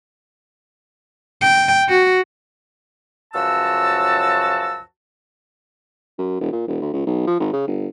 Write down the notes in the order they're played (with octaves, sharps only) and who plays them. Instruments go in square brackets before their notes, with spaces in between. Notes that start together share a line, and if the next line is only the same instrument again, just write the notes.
[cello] G5
F#4
[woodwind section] C#2 F#2 F3 F#4 A5 E6
[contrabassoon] F#2
E1
A#2
E1
D2
C#2
B1
F3
G#1
C#3
G1